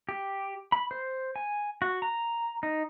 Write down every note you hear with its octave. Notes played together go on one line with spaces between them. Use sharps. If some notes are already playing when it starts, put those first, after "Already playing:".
G4
B5
C5
G#5
F#4
A#5
D#4